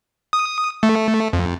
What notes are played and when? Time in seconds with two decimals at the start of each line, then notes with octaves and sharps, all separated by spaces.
0.33 D#6
0.83 A3
1.33 F2